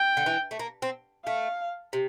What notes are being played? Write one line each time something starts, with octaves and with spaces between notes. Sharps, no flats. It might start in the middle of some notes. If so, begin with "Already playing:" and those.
Already playing: G5
D3
E3
A3
A#3
C4
A3 F5
C3